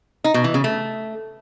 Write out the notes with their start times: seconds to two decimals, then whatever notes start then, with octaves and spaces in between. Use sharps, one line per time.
0.24 D#4
0.34 B2
0.44 E3
0.54 C#3
0.64 A3